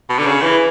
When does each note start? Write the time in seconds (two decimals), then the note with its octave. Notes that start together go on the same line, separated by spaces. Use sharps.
0.10 B2
0.19 D3
0.26 C#3
0.42 E3